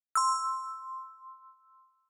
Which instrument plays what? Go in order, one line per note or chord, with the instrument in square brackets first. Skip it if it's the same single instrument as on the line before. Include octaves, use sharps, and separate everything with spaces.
[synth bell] C6 E6